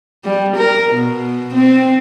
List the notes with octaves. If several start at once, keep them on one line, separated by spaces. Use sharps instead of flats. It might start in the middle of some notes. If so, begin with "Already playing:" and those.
G3
A#4
B2
C4